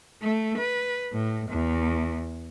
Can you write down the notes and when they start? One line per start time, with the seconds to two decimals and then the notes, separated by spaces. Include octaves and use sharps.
0.23 A3
0.58 B4
1.12 A2
1.50 E2